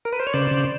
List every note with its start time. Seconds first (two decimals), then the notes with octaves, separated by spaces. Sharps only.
0.05 A#4
0.13 B4
0.19 C5
0.27 C#5
0.33 C#3 C5 D5
0.51 C#3